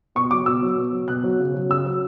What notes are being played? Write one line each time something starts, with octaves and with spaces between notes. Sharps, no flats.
B2 C#6
F#3 D6
B2 E6
F#3
B2
F#3
B2 F#6
F#3
C#3
F#3
C#3 E6
F#3